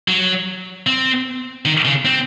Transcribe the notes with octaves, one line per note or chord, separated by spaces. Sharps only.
F#3
C4
D#3
C#3
C4